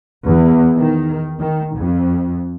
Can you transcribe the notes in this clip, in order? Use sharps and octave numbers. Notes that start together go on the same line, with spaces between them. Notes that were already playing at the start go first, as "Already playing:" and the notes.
E2
D#3
D#3
F2